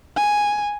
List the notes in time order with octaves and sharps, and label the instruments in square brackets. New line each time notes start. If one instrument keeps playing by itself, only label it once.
[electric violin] G#5